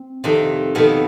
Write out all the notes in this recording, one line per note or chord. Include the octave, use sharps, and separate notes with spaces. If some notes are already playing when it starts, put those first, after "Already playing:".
Already playing: C4
F2 C3 D#3
F2 B2 D#3 B3